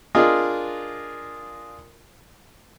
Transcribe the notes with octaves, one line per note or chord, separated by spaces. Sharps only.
D4 F4 G#4 A#4 D#5